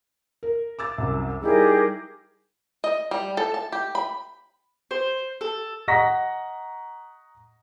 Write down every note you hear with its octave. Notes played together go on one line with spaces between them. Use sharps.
A#4
D6 E6 A6
C2 F#2
G3 D#4 E4 G4 G#4 A#4
D#5
G3
A4
A5
G4
B5
C5
A4
D#5 F#5 A#5 C#6 A#6 B6